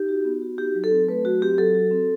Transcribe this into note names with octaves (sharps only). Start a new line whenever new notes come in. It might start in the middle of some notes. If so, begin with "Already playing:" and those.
Already playing: D#4 G4
F#4
B3
F#4
D#4 G4
F#3
A4
C4
A3 B4
F#3 F#4
C4 G4
F#3 A4
F#4
C4